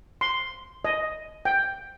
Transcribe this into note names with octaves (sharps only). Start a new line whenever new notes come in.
C6
D#5
G5